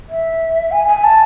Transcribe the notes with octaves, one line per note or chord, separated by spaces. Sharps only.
E5
G#5
G#5
A5